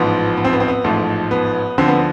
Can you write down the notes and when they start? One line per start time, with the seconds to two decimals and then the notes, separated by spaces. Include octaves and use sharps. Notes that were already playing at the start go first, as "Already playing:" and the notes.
Already playing: A1 G#2 F3 B3
0.37 B3
0.45 C4
0.53 B3
0.60 C4
0.68 B3
0.84 A1 G#2 F3 A3
1.31 B3
1.78 D2 D3 F3 C4
1.88 B3